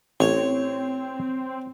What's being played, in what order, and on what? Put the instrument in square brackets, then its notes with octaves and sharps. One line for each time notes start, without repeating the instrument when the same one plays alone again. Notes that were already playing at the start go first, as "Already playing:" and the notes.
[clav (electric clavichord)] A1 [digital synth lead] C4 [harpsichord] C#5